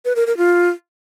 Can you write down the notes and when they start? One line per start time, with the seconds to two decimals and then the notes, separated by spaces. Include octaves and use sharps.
0.05 B4
0.16 A#4
0.27 A#4
0.37 F4